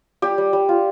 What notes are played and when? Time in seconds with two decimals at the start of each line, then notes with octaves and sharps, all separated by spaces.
0.22 G3 G4
0.38 G3
0.53 G3
0.69 F4